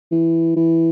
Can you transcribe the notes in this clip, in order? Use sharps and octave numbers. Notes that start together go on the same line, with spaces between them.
E3
E3